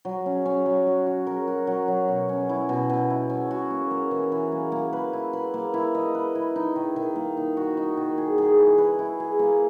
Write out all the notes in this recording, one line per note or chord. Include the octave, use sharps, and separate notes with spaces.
F#3
C#4
C#4
F#3
F#4
F#4
A#4
F#4
F#3
F#3
B2
C#4
E4
B2
B2
E4
C#4
F#4
A#3
A#3
E3
E3
A#3
A#3
B4
E4
B4
A#3
E4
D#5
B4
E4
D#4
D#3
D#3
A#3
D#4
F#4
D#4
D#3
G#4
G#4
E4
B4
E4
G#4
A#3